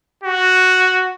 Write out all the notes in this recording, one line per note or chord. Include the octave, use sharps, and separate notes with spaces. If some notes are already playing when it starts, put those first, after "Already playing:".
F#4